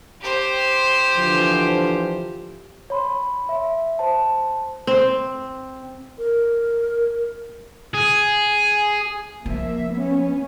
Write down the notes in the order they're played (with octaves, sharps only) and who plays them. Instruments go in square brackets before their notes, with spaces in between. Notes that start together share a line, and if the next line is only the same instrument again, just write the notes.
[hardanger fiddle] G4 C5
[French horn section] D3 E3 F3
[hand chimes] C#5 B5 C6
E5
C5 A5
[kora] C4
[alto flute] A#4
[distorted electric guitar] G#4
[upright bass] F3 [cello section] A#3 E5
[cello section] B3 C#4